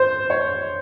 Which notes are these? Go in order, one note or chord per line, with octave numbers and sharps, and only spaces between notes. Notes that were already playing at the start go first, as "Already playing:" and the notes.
Already playing: C5
C#5